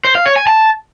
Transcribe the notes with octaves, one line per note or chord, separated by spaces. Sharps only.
C5
F5
C#5
G#5
A5